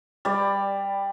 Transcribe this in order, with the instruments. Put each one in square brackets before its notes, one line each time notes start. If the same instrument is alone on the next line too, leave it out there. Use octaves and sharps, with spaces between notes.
[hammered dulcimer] G3 D5